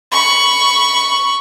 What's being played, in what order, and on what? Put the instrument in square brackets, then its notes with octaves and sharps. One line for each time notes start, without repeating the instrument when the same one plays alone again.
[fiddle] B5 C#6